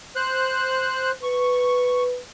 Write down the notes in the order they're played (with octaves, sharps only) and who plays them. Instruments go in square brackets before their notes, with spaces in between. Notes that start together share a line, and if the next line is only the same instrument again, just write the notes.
[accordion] C5 F#6
[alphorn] B4 [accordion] C#6